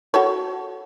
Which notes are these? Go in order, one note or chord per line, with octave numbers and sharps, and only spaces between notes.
F#4 A4 C#5